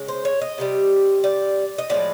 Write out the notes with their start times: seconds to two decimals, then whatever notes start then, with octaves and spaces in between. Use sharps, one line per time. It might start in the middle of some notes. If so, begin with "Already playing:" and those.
Already playing: C#3 G#3
0.08 C5
0.25 C#5
0.41 D#5
0.58 C3 D#3 G3
1.24 D5
1.78 D#5
1.90 A2 F3 G#3 D5